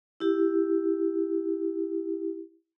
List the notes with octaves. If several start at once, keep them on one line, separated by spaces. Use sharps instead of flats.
E4 G4